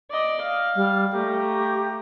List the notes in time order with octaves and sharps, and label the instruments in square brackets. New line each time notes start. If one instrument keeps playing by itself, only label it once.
[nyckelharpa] D5 D#5
F5
[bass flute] G3
[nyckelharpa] A3 A#5 [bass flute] G4